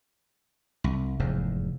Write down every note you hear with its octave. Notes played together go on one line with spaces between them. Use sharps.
C2
F1 E2 G#2